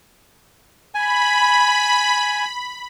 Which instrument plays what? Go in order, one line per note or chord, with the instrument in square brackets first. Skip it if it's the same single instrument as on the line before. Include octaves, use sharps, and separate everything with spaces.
[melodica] G#5 [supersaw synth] B5